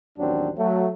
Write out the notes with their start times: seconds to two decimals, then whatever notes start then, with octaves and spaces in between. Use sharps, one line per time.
0.18 A1 D#2 F#3 C4 D4
0.57 F#3 A3